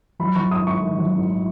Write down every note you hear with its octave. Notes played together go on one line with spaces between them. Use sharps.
F#3 B5
F#3 C#6
G#1 D#6
G#1 C#6
D#3
F#3
G#1